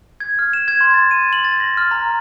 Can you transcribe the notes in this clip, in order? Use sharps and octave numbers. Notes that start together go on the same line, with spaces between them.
G#6
F6
E7
G#6
C6
A6
D#7
F#7
A6
A#6
F6
A#5